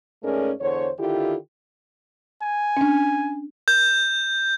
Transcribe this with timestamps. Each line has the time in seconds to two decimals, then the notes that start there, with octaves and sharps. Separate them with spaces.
0.23 G#2 A3 C#4 G#4 A#4 D5
0.61 E2 D3 C5 C#5
0.99 D3 D#3 E4 F4 G4
2.42 G#5
2.77 C#4 D4
3.68 G6